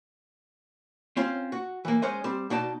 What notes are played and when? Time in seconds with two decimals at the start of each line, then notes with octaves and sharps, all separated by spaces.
1.17 C4 C#4 F4
1.52 F#4
1.85 E3 A#3
2.02 G#3 C#4 C5 D#5
2.24 G3 C4
2.50 B2 D#4 D5 A5